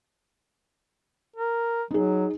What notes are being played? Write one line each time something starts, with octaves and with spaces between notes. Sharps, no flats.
A#4
F#3 D#4 G#4